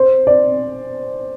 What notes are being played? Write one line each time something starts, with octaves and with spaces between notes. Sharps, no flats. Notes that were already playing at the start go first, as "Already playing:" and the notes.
Already playing: C5
D5